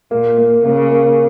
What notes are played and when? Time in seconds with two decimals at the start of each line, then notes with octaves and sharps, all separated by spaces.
0.11 A#2 A#3
0.38 A#3
0.64 C#3 A#3
0.91 A#3